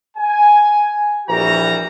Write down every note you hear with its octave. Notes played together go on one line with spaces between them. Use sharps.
G#5
A#1 E3 G3 F#4 A#5